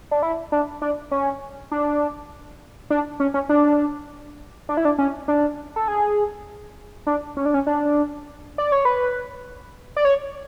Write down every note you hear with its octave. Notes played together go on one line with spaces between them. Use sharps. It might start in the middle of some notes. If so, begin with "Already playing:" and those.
D4
E4
D4
D4
C#4
D4
D4
C#4
C#4
D4
D4
E4
D4
C#4
D4
A4
G#4
D4
C#4
D4
C#4
D4
D5
C#5
B4
D5
C#5